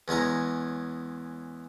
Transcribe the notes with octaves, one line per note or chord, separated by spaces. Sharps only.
E2 G#3 C#4 A#5